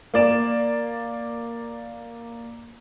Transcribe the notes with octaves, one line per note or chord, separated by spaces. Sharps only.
A#3 D5 E7